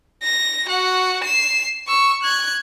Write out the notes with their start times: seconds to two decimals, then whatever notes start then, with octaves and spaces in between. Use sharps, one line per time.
0.23 A#6
0.67 F#4 F#5
1.24 C7 E7
1.88 C#6 E6
2.23 F#6 G#6